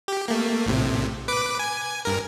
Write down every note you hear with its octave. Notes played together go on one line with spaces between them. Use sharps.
G4
A3 A#3
A#1 A2 C3
B4 D6
G#5
G2 A#4